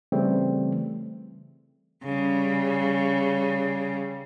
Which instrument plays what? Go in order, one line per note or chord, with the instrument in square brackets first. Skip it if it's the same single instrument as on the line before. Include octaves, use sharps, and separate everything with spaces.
[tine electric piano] C#3 E3 G3 A3 C4
[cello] C#3 G3